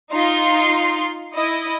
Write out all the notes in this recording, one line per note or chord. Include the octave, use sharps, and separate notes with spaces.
D#4 F4 C6
E4 D#5